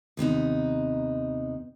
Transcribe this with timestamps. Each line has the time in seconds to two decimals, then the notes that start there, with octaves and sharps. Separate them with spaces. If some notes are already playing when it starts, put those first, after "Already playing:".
0.17 D#2 C3 B3 D#4